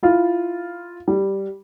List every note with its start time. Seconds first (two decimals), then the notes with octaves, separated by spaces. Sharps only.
0.03 E4 F4
1.08 G3